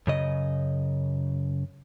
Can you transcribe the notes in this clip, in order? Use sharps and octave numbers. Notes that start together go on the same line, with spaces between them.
F#2 C#3 D#5